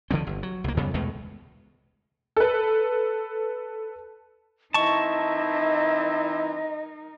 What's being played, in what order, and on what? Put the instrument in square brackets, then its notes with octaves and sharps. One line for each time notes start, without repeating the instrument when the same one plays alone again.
[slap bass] B2 D3 F3 C4
G1
F#3
C2 A#3
F2 C#3 G3 B3
E2 B2 G#3 A3
[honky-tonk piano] A4 B4
[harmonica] E3 C4 E4 [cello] D#4 A#4 [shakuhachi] D#5 [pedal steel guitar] A5 C#6